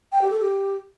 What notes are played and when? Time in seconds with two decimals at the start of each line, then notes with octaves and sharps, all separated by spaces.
0.12 G5
0.22 G4
0.31 A4
0.40 G4